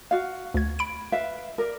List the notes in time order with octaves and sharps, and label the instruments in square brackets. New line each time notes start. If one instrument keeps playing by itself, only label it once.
[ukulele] F#4 F5
[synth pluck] D2 G#6
B5 D7
[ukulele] B4 E5 F5
A#4 D5